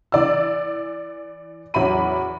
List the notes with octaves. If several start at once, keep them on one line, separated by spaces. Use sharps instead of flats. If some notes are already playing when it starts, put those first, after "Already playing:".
E3 D5 E6
E2 F#3 C#4 E5 B5 D#7